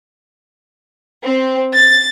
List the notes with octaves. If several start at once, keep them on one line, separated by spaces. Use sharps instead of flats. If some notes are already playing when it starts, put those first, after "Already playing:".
C4
A6